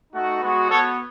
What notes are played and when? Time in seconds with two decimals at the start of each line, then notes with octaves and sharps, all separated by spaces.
0.11 A3 D#4 F#4
0.41 G#3 B3 F#4
0.70 B3 F#4 A4 C#5